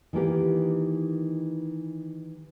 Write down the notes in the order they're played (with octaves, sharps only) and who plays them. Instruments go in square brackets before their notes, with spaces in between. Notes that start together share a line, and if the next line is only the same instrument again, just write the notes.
[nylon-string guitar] D#3 E3 A#3 G4